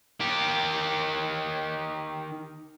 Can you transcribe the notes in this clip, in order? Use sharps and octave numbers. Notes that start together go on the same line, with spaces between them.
D#3 G4